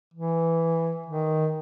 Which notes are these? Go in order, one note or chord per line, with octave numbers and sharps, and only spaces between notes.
E3
D#3